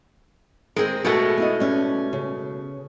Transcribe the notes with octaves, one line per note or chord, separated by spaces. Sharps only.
G#3 C4 G#4 A#4
B2 G#3 A3 F#4 A4
B3 E4 D#5
G3 C#4
C#3